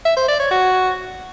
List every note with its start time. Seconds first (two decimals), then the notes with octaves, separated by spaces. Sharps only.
0.05 E5
0.17 C5
0.28 D5
0.40 C#5
0.51 F#4